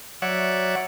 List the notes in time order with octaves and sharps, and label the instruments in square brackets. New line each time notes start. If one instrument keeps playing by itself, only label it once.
[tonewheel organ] F#3 C#5 D5 E5 F#5